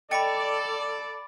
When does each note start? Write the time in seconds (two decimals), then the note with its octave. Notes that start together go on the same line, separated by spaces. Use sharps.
0.11 A4 D5 D#5 G5 B5 D6 A6 C#7